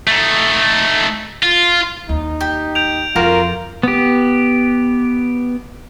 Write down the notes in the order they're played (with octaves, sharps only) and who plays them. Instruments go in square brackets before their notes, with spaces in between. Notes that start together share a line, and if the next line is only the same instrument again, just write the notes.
[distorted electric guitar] A3 D#4
F4
[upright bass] D#2 [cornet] D#4
[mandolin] G4
[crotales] G6 D7 F7
[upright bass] F2 [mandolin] A#3 F#4 A#4 [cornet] F4
[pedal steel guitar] B3 G4